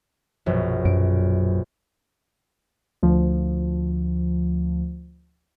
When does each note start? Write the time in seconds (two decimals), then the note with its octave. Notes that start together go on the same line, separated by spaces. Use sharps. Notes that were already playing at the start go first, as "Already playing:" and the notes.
0.46 A#1 F#2 B2
0.85 F#2 D7
3.03 D2 F3